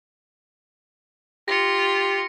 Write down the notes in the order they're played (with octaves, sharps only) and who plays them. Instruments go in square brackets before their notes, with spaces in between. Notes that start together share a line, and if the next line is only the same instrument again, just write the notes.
[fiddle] F4 [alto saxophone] G4 [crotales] A#6 C#7